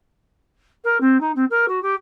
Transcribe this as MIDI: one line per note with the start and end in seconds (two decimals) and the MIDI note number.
0.84 0.98 70
1.00 1.20 60
1.20 1.31 63
1.35 1.45 60
1.50 1.65 70
1.68 1.82 66
1.82 1.95 67